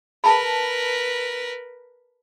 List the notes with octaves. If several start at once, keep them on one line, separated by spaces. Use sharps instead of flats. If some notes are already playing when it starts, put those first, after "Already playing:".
A#4 B4 A5 B5